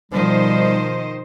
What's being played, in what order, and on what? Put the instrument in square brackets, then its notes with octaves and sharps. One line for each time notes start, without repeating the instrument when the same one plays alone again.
[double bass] B2 F3 [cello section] D#3 C5 D#5 [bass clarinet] G3